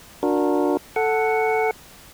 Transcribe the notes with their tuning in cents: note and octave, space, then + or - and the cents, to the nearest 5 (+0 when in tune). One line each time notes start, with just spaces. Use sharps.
D4 +0 F#4 -30 A#4 +0
A4 +0 F#5 +0